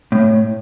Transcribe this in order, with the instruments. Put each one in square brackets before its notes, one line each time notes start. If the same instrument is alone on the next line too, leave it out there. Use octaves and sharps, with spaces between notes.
[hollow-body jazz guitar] A2